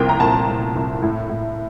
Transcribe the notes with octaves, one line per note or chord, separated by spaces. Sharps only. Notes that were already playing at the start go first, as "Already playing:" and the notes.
Already playing: C2 A#2 F3 A#4 G5
A#5
A#2 A5
A#2
C2
A2
A2